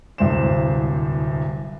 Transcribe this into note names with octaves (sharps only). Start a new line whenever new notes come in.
D1 C2 G2 C5 C6 E7